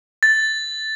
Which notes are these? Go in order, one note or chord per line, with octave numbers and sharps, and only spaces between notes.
A6